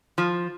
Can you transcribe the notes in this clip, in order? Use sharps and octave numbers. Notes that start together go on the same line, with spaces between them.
F3